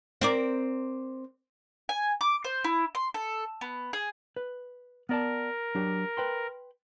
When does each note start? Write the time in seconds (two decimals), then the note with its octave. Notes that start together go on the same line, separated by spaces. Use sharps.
0.21 C4 A#4 D5
1.89 G#5
2.21 D6
2.44 C5
2.64 E4
2.95 C6
3.14 A4
3.61 B3
3.93 G#4
4.36 B4
5.09 B3 A#4 D5 A5
5.75 F#3 D4 G4
6.17 B4 G5 C6